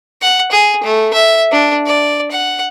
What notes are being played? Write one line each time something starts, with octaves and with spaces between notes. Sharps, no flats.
F#5
G#4
A3
E5
D4
D5
F#5